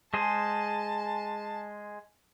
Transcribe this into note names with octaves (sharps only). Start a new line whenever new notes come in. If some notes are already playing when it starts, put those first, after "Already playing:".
G#3 G#4 C5 A5